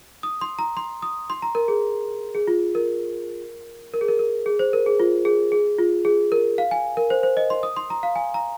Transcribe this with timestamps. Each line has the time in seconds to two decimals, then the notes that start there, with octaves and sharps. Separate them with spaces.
0.23 D#6
0.41 C6
0.59 A#5
0.77 C6
1.02 D#6
1.30 C6
1.42 A#5
1.55 A#4
1.68 G#4
2.35 G#4
2.47 F4
2.75 A#4
3.94 A#4
4.01 G#4
4.08 A#4
4.19 A#4
4.46 G#4
4.59 C5
4.73 A#4
4.86 G#4
5.00 F4
5.25 G#4
5.52 G#4
5.78 F4
6.05 G#4
6.32 A#4
6.58 F5
6.71 G#5
6.97 A#4
7.10 C5
7.23 C5
7.37 D#5
7.50 C6
7.63 D#6
7.77 C6
7.90 A#5
8.03 F5
8.16 G#5
8.34 A#5